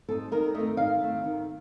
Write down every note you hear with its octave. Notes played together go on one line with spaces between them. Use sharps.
C4 D#4 A4
D#3 A#4
A3 C4 D#5
D#3 F5
A3 C4
D#3